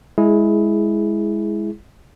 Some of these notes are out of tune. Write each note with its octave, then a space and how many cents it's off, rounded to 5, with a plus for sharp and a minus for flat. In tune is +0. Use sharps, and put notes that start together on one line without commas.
G#3 +0 E4 +0 G#4 +15